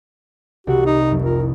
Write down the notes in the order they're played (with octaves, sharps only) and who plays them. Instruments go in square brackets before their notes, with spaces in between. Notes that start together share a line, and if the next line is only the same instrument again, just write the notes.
[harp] C2 [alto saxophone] F#4 [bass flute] G4
[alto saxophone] D#4
[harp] F1 [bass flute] F#3
[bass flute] F4 [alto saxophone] A#4
[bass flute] E4